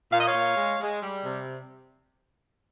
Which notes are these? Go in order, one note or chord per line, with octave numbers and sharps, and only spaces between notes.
A#2 F5
D#5
C#5 F5
A#2
G#3
G#3
G3
C3